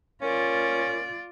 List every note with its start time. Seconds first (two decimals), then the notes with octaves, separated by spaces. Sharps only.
0.22 C#4 F4 A#4 D5